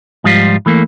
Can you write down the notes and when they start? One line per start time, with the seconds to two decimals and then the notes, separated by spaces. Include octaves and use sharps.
0.24 G#2 F3 G3 F4
0.66 E3 A3 A#3